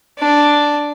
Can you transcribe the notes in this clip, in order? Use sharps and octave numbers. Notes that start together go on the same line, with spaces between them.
D4